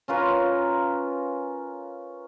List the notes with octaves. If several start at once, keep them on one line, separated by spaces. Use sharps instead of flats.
C#4 F4 A#4 B4